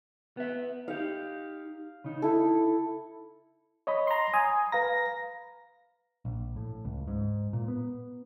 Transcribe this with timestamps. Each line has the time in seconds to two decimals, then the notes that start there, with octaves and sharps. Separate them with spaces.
0.37 B3 E5
0.88 D#4 G4 F5
2.04 C#3 D#4
2.22 E4 A4
3.87 C#5 D#5 B5
4.07 A#5 C6
4.34 G#5 D#6
4.72 B4 F5 A#5 A#6
6.25 A#1
6.56 A2
6.85 C#2
7.08 G#2
7.53 A#2
7.68 B3